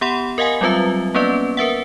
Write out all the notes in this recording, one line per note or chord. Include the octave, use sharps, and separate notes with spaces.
B3 G4 F#5 B5 C6
A#4 D#5 F5 F#5 G#5
F#3 G3 C4 F4 B4 E5
A#3 B3 C#4 B4 D5
A#4 B4 E5 F#5